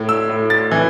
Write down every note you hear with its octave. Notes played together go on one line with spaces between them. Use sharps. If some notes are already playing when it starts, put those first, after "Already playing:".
Already playing: A2
E6
A2
A6
E3